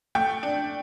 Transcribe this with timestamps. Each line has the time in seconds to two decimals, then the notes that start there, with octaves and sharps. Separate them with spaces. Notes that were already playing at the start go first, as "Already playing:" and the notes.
0.15 A3 G5
0.43 D4